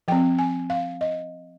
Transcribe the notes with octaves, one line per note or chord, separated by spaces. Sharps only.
F3 C4 G5
G#5
F5
D#5